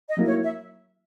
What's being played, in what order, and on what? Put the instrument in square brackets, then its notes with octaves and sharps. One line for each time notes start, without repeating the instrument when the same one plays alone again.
[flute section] D#5
[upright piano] F#3 A#3 E4
[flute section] C#5
E5